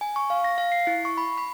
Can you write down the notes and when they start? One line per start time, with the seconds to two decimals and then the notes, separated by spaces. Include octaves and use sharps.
0.01 G#5
0.16 C#6
0.30 F5
0.44 A#6
0.58 F5
0.72 C7
0.87 E4
1.05 C#6
1.17 B5
1.38 B5